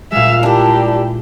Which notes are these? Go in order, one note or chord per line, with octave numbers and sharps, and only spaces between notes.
A#2 G#3 E5 F5
D4 E4 G4 A#4